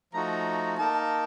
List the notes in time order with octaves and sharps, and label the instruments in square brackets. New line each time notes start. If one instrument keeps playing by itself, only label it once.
[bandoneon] F3 A3 D#4 F#4 [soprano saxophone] A#5
[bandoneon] A#3 D#4 A#4 [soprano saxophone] A5